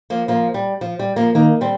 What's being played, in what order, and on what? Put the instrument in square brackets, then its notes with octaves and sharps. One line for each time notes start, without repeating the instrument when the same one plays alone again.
[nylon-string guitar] F3 A#3
F3 A#3
G3
F3
G3
F3 A#3
[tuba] D#3 [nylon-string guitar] A#3 D#4
[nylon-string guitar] G3 C4